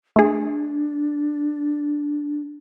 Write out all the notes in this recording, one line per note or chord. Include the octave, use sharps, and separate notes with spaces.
A3 D4 G#4